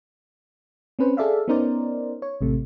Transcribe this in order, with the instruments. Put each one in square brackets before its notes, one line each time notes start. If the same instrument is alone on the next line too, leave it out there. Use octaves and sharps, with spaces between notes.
[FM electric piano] C4 C#4 B4 C5
G#4 A4 D5 E5 F5
B3 C#4 D#4 A#4 C5 D5
C#5
A1 C3 A3